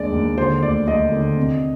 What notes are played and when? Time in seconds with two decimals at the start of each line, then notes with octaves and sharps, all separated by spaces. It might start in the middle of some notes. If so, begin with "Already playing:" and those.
Already playing: D#2 G#3 D4 D5
0.12 D#2
0.37 D3 C5
0.62 D2 D5
0.87 D2 D#5
1.12 D3
1.37 C3